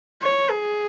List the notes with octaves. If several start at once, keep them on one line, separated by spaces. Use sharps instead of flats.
C#5
G#4